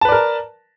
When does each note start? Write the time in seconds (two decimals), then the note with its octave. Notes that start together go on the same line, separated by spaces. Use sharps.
0.01 A5
0.05 B4
0.09 D5
0.12 A#4